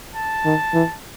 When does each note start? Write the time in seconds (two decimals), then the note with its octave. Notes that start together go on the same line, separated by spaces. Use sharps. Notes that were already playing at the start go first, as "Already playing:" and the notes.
0.15 A5
0.45 D#3
0.74 E3